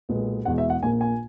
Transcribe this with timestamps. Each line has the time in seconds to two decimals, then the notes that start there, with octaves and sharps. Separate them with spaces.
0.09 B1 A#2 G#3 B3
0.45 E2 B2 G#3 F#5
0.58 E5
0.70 F#5
0.82 A#1 A#2 A#3 G#5
1.01 G#5